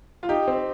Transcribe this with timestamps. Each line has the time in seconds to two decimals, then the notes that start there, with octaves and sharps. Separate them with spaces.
0.23 F4
0.29 D#4 G4
0.48 C4